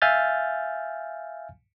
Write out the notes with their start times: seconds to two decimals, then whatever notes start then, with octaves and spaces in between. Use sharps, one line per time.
0.02 E5 F5 G#5 F6 G6 A6